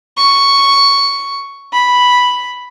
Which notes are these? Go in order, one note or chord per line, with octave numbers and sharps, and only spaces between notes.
C#6
B5